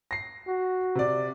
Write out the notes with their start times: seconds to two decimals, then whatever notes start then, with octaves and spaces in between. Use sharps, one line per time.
0.11 A#6 C7
0.48 F#4
0.95 C3 D5